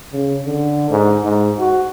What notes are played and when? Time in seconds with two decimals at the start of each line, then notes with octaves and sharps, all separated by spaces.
0.12 C#3
0.46 D3
0.90 G#2
1.25 G#2
1.59 F#4